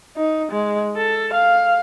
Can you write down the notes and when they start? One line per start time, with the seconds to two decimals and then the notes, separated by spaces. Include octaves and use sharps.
0.17 D#4
0.52 G#3
0.97 A4
1.34 F5